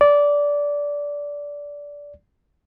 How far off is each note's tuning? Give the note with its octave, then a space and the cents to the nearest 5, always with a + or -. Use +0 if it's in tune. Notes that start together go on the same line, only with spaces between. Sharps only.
D5 -15